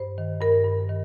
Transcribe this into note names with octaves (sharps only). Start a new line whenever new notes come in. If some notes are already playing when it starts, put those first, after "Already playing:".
Already playing: G2 C5
D#3
G2 A#4
G2
D#3